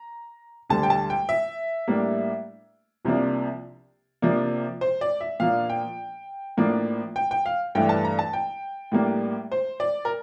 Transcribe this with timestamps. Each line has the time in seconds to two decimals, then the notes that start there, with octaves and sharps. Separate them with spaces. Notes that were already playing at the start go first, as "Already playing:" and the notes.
Already playing: A#5
0.70 D2 D3 G3 A5
0.83 G5
0.90 A5
1.10 G5
1.29 E5
1.88 A2 G3 A#3 D4
3.05 C2 C3 F3 A#3 D4
4.22 C3 F3 A#3 D4
4.81 C5
5.01 D5
5.21 E5
5.40 A#2 F3 A#3 D4 F5
5.70 G5
6.57 A2 F3 A#3 D4
7.16 G5
7.31 G5
7.46 F5
7.75 G2 E3 A3 D4 G5
7.89 A5
8.05 A#5
8.19 A5
8.33 G5
8.92 A2 G3 A#3 D4
9.52 C5
9.80 D5
10.05 A#4